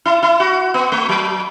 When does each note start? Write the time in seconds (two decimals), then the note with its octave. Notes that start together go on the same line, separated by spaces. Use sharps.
0.05 E4
0.23 E4
0.40 F#4
0.74 B3
0.92 A3
1.09 F#3